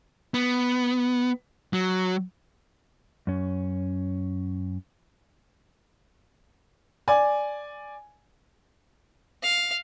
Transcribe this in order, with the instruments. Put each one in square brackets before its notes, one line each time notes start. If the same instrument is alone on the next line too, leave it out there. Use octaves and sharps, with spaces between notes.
[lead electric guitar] B3
F#3
[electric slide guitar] F#2 C#4
[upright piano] D5 G#5
[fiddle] F5